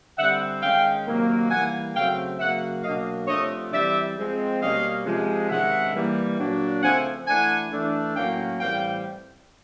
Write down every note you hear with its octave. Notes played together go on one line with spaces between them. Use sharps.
D3 G3 C4 E5 F#5
D#3 G#3 C#4 F5 G5
C3 D#3 F#3 A#3
E3 G3 A#3 F#5 G#5
C#3 F#3 A3 C4 F5 G5
C#3 F#3 A#3 E5 F#5
B2 F#3 A#3 D4 D#5 F5
C3 F3 A3 D4 C#5 D#5
E3 G3 C4 D5 E5
F3 G#3 C4
B2 G3 A#3 C#4 D#5 F5
C3 F3 G#3
C3 D#3 G#3 C#4 E5 F#5
E3 G3 A#3
A#2 F#3 A#3 D4
C#3 F3 A3 C4 F#5 G#5
E3 A3 D4 F#5 G#5
E3 A3 D4
A2 F#3 A#3 C#4 F5 G5
A2 E3 G3 C4 F5 G5